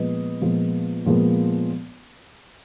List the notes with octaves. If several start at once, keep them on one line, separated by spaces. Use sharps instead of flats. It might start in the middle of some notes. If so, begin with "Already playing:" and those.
Already playing: A#2 F3 G#3 B3 B4 D#5
A#2 F3 G#3 B3
A#2 F3 G#3 B3